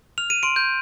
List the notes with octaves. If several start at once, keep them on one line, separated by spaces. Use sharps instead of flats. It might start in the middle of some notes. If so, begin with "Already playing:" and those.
F6 F7
D#7
C6 D7
G6